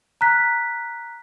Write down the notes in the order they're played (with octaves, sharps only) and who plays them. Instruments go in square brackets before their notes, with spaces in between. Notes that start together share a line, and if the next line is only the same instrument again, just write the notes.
[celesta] A#5 F6 F#6 B6